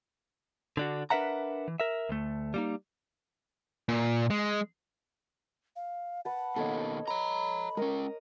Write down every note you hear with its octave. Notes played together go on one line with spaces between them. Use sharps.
D3 D4 F#4
D4 A#4 B4 E5 F#5 A#5
E3
A#4 E5
D2 A3
G3 A#3 D#4
A#2
G#3
F5
B4 F#5 A5
B2 D#3 A#3 A4 C#5 D#5
C#5 A#5 B5 C#6
G#3 C#4 A#4 D#6